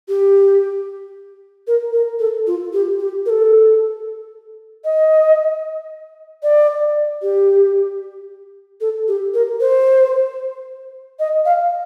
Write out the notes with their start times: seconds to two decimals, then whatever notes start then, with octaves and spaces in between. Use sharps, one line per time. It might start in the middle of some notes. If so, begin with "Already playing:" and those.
0.08 G4
1.67 A#4
1.93 A#4
2.19 A4
2.47 F4
2.73 G4
3.00 G4
3.26 A#4
3.30 A4
4.85 D#5
6.43 D5
7.22 G4
8.81 A4
9.08 G4
9.34 A#4
9.60 C5
11.19 D#5
11.45 F5